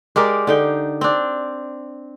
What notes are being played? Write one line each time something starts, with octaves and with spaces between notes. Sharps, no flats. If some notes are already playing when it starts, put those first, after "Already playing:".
G#3 G4 A#4 D5
D3 D#4 G5
C4 D4